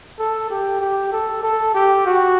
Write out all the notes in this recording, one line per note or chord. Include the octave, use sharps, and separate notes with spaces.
A4
G4
G4
A4
A4
G4
F#4